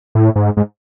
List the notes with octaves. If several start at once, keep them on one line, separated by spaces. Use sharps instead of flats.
A2
G#2
G#2